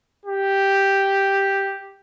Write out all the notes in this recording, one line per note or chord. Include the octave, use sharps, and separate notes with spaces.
G4